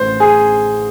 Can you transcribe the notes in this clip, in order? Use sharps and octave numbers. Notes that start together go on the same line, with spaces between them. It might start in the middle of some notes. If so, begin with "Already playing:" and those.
Already playing: A1 A2 A3 C5
G#4